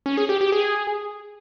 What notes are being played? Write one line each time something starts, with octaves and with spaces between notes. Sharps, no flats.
C#4
G#4
G4
G4
G#4